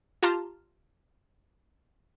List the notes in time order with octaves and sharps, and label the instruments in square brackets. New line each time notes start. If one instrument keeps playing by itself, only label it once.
[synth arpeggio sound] F4 G4 A5 A#5 C6 F6